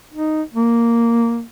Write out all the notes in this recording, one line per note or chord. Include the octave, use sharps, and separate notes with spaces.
D#4
A#3